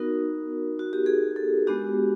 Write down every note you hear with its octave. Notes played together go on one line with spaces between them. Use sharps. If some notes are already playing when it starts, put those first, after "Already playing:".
Already playing: B3 D#4 F#4 A#4
F#4
G4
G#4
A4
G#3 B3 D4 F#4 G4